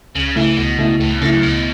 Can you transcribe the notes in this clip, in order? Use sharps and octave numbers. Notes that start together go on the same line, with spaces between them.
C#2 C#3
C#3 E3 A3 E4
C#2 B2
C#3 A3 E4
C#2 A2
E2
F#2 C#3 A3 E4
F#2
C#2 B2